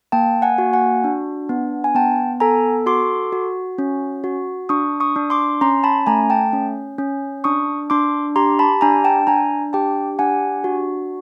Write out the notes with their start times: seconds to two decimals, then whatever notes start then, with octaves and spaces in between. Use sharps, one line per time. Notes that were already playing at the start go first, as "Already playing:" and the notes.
0.12 A#3 G5 A5
0.42 F#5 G#5
0.58 F#4
0.73 F#5 G#5
1.04 D4
1.49 B3
1.84 G#5
1.95 B3 G5 A5
2.40 A4 G#5 A#5
2.86 F#4 C6 D6
3.33 F#4
3.78 C#4
4.24 F#4
4.69 D4 C#6 D#6
5.00 C#6 D#6
5.16 D4
5.30 C6 D6
5.61 C#4 A#5 C6
5.84 A5 B5
6.07 A3 G#5 A#5
6.30 G5 A5
6.53 C#4
6.98 C#4
7.44 D4 C#6 D#6
7.90 D4 C6 D6
8.36 G4 A#5 C6
8.59 A5 B5
8.81 D4 G#5 A#5
9.04 G5 A5
9.27 D4 G#5 A#5
9.73 G4 G5 A5
10.19 D4 F#5 G#5
10.64 F#4